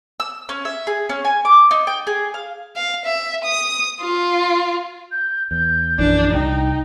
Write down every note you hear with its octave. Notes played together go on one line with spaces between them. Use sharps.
E6
C#4
E5
G#4
C#4
G#5
D6
D#4
G5
G#4
F5
F5
E5
D#6
F4
G6
E2 G6
A#1 F#2 E3 D4
C2 D#4 G5